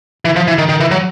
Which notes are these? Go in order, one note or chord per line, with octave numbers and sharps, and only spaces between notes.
E3
F3
E3
D#3
D#3
E3
F#3